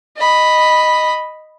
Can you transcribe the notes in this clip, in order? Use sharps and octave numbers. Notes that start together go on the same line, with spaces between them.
D#5 B5